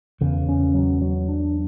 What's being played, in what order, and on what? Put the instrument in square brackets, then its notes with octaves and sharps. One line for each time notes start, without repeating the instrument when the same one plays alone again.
[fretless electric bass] E2 [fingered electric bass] C#3
[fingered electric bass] C#4
F#3
F#3
D4